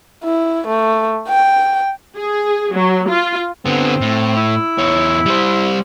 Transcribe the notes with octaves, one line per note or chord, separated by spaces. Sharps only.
E4
A3
G5
G#4
F#3
F4
D3 B3 C4
A2
E4
E2 C#5
G3 C5